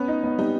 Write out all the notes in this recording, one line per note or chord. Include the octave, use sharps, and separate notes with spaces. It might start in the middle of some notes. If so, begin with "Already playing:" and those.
Already playing: B3 C#4
D#4
B3
G3 D#4